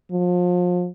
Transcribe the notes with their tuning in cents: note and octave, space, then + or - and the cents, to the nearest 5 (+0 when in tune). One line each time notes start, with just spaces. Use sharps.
F3 +35